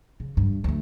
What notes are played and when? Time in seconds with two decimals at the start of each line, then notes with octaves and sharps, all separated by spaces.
0.20 C#3
0.37 G2
0.64 D2 A3